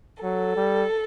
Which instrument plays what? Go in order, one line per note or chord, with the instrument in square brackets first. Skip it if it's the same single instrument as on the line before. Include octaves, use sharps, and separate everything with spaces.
[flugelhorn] F#3 [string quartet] A4
[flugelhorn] G3